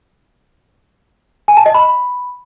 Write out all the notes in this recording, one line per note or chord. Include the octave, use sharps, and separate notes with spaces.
G#5
A5
D#5
B5